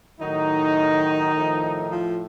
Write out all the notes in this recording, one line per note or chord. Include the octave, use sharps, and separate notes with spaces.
A2 D#3 F#3 D#4
A2 F3
F3 F4